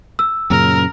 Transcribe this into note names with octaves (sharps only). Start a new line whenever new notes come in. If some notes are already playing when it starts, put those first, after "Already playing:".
E6
F#2 A#2 C#3 A#4